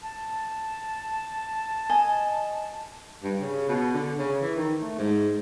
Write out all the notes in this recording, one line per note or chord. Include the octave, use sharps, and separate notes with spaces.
A5
D#5 G#5
G2
C#3
B2
D3
C#3
E3
D#3
A3
G#2